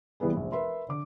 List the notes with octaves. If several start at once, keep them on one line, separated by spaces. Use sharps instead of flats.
E2 E3 G3 B3 G#4
F1 A#1
A#4 B4 E5 B5 C6
D3 D6